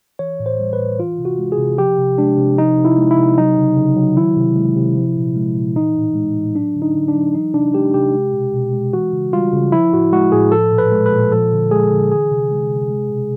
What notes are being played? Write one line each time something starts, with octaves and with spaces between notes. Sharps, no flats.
E3 C#5
A2
C5
G3
B4
A2
E3 F4
C3
F#4
G#3
G#4
C3
F3 G4
C3
G#3 D4
C3
F3 D#4
C3
E4
G#3
E4
C3
F#3 D#4
C#3
C#3
F#3
D#3 E4
C3
G#3
C3
F3
A#2
G#3
A#2
E3 D#4
A2
G#3
A2
F#3 D4
D3
D#4
D3
D4
F#3
E3 D#4
C3 D4
G#3 G4
C3 G4
G#3
B2
B2
G#3
E3 F#4
C#3
G3 F4
C#3
F3 E4
A2 F#4
G#3 F#4
A2 G#4
F3 A4
A#2
B4
G#3
B4
A#2
F3 A4
D3
G#3 G#4
D3
E3 G#4
C3
G#3
C3
G#3
B2